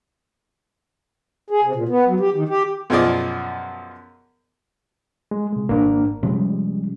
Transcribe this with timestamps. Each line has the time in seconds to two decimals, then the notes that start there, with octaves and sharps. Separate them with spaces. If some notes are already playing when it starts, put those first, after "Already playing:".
1.50 G#4
1.64 C3
1.75 A#2
1.89 B3
2.06 F#3
2.20 G4
2.34 D#3
2.49 G4
2.90 F#2 B2 F3 G#4 D5 D#5
5.31 G#3
5.53 C3 G#3
5.69 G#1 A#3 D4 A#4
6.23 C3 F3 G3 G#3 C#4